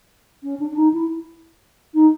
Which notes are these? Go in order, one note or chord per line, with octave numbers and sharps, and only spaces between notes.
C#4
D4
D4
D#4
E4
D#4